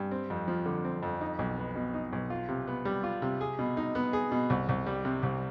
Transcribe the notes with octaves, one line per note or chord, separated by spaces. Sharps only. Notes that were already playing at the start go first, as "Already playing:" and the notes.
Already playing: G2
C4
F2
F3
D3
C4
F2
D#4
B1
B3
B2
D#4
B1
F4
C3
B3
G3
F4
C3
G#4
B2
D#4
B3
G#4
B2
C2
C2
G3
C3
C2